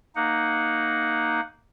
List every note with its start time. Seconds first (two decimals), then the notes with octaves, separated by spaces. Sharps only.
0.16 A#3 D#4 F#5